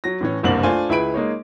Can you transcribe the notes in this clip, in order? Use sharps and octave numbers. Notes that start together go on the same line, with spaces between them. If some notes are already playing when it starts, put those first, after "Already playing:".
F#3 A#6
A2 E3 C#4
F#1 C2 G2 A#3 C5 F#7
A3 D4 F4 C5 G#5
C#2 E4 G#4 B4 B5 D7
G#3 A#3 D#4 C#5